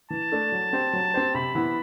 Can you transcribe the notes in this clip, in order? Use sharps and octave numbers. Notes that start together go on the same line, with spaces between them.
E3 A5
A3 D4 A4
F#3
C4 G4 C5
F#3
C4 G4 C5
C3 B5
E3 B3 E4